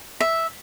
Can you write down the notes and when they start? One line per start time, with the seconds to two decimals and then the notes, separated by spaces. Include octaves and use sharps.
0.21 E5